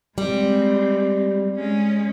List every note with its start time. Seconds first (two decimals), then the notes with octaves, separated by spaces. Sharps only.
0.18 G3 G#3 C4
1.56 G#3 C#4